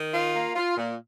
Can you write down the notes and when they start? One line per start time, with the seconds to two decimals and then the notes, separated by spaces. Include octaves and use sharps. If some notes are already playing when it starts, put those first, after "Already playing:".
Already playing: D#3
0.13 F4
0.35 A#3
0.55 F4
0.77 A#2